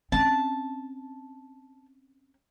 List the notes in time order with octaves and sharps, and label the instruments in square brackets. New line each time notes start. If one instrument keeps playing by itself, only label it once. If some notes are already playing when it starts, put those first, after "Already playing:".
[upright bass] C4 C#4 [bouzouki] A5